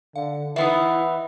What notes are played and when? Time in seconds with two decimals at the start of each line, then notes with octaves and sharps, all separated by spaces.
0.16 D3 F5
0.56 E3 B3 D#4 E4 E5